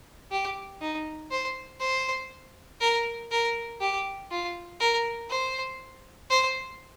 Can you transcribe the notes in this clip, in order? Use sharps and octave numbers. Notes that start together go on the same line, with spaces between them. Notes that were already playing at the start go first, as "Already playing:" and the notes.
G4
D#4
C5
C5
A#4
A#4
G4
F4
A#4
C5
C5